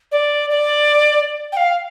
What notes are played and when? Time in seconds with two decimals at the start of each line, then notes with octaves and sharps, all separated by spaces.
0.12 D5
0.50 D5
1.52 G5
1.57 F5